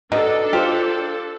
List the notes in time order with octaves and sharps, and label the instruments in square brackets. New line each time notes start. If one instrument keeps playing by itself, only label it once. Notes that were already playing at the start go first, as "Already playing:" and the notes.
[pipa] B2 [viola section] D4 A4 [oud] D#4
[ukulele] F4 [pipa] G4 C5